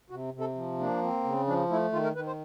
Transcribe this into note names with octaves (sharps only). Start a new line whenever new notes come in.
C3 F#4
C3
A4
F3
A#3 D4
C4
C#3
F3 D4
A3 E4
D#3 F4
A#4
D#3 B4
C5